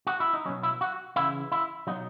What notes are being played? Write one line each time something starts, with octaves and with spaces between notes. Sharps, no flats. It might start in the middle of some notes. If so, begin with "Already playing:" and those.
F#4
E4
D#4
B2 F#3 C#4
E4
F#4
C#3 E3 E4
E4
B2 F#3 D#4